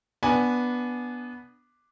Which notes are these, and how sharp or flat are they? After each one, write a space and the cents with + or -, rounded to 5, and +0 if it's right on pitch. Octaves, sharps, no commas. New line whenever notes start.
B3 -5 D4 +0 G#5 +0